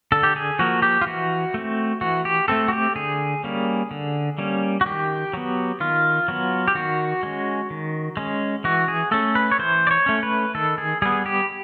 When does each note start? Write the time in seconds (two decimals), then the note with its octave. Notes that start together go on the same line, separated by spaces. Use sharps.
0.12 D3 A4
0.23 G4
0.36 G#4
0.59 F3 A#3 F#4
0.82 G4
1.01 F4
1.06 E3 F#4
1.54 A3 C4
2.01 E3 F#4
2.25 G4
2.48 A3 C4 A4
2.68 F#4
2.73 G4
2.96 D3 G#4
3.44 G3 A#3 C#4
3.91 D3
4.38 G3 A#3 C#4
4.81 F#4
4.85 D#3 G4
5.34 F#3 B3
5.80 D#3 F4
6.28 F#3 B3
6.68 G4
6.75 D#3 F#4
7.23 G#3 C#4
7.70 D#3
8.17 G#3 C#4
8.64 E3 F#4
8.88 G#4
9.11 A3 C#4 A4
9.35 B4
9.52 C#5
9.59 E3 C5
9.87 D5
9.91 C#5
10.06 A3 C#4
10.23 B4
10.55 D#3 A4
10.78 G#4
11.02 G3 B3 G#4
11.26 G4